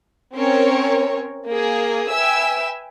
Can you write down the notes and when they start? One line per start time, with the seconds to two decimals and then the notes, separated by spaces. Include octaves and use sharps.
0.35 C4 C#4 A#4 C#5
1.48 A#3 G#4
2.08 B4 E5 G5 G#5 E6